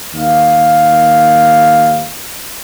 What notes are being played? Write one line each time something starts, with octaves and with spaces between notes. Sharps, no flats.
D#2 F5